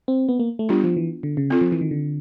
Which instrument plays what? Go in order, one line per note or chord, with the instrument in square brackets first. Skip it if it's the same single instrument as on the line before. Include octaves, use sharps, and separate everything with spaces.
[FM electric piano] C4
B3
A#3
A3
[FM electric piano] G3 [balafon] B3 D4 F4
[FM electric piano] F3
E3
D3
C#3
[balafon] C4 F4 A4
[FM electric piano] F3
E3
D#3
D3